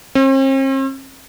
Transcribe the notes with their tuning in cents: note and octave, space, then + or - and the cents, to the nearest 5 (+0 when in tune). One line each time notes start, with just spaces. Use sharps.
C4 +45